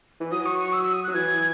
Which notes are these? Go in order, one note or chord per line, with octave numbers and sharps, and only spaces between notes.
E3
F#3 D#6
C#6
C#6
E6
E6
D#6
F#3 F#6
E3 G#6